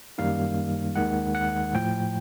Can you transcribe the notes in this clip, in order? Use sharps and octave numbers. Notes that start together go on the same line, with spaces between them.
F#2 D#3 G3 A#3 D#4 F5
D#2 D#3 G#3 F#5
F#5
A2 F3 A3 G5